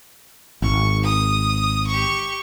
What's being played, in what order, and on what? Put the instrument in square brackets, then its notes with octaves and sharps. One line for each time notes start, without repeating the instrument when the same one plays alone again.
[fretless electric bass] G#1 [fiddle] C#6
[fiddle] D#6
G4 C#6